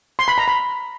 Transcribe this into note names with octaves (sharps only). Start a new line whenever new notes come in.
C6
B5
A#5
B5